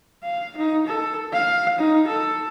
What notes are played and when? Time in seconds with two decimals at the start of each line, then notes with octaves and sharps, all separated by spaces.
0.23 F5
0.57 D#4
0.87 A4
1.33 F5
1.78 D#4
2.08 A4